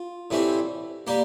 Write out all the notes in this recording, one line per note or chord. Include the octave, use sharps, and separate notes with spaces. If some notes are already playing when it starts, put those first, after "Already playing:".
Already playing: F4
A2 E3 G3 C4
G3 A#3 G4